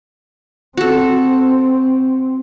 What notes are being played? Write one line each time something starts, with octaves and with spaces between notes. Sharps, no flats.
C4 F#4 A4